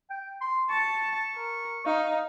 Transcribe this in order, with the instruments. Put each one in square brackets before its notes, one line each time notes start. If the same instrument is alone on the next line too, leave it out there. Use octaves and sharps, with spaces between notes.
[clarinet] G5
C6
[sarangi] A5 [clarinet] C#6
[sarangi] A#4
[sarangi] D#4 [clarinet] F5